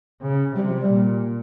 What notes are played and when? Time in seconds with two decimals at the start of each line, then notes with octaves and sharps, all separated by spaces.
0.22 C#3
0.55 C3 G3
0.67 F3
0.78 G3
0.89 A#2